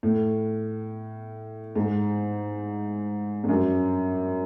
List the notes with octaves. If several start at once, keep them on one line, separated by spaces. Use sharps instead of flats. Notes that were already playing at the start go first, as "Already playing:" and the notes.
A2
G#2
G2
F#2